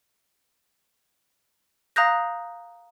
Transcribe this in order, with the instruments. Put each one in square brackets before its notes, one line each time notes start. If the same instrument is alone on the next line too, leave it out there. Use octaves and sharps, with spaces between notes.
[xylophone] F5 A#5 D#6 F#6 G6 A#6